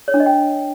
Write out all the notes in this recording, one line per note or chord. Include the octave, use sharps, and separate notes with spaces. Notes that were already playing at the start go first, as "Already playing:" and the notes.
C#5
D4
D#5
G5